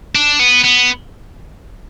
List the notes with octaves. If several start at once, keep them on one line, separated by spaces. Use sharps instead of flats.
D4
B3
B3